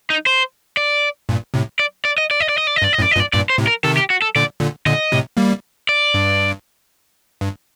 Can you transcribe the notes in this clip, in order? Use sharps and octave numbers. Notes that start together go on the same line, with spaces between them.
D#4
C5
D5
G2 A#2
A2 C3
D5
D5
D#5
D5
D#5
D5
D#5
D5
D#5
G2 D5
D#5
F#2 A2 D5
D#5
G2 A#2
D5
G2 A#2 D5
C5
A2 C3
A#4
C3 D#3 A4
G4
F#4
A4
A#2 D3 D5
A#2 D3
A#2 D3 D#5
A2 C3
G3 A#3
D5
G2
G2